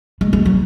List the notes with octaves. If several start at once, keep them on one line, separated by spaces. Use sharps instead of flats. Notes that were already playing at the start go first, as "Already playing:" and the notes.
G#3
G#3
F#3